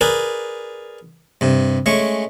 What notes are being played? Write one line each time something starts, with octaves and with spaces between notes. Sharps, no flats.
G#4 A#4 B4 D5
G2 C3
G#3 A3 C#4 C#6